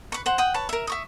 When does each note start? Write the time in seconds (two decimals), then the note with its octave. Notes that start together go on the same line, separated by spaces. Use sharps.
0.12 B4 C#6
0.26 C5 F#5
0.38 F#5 G5 D#6
0.54 B4 C#5 A5
0.69 A#4 E5
0.87 E5 C#6 D#6